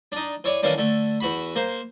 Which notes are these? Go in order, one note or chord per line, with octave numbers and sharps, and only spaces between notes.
D4 D#4
E3 C#5 D5
D#3 E3 A#3 C#4 D4
D3 A3
E2 F#4 B5
A#3 C5